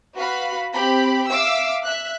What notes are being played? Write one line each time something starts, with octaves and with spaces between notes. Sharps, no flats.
F#4 B4 F5 B5
C4 G4 B5
E5 F5 D6 E6
E5 F#6